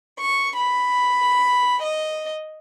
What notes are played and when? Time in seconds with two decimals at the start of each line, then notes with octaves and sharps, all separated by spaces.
0.22 C#6
0.57 B5
1.84 D#5